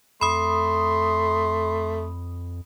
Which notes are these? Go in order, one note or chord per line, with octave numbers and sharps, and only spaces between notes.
F2 A3 B5 C6 D#6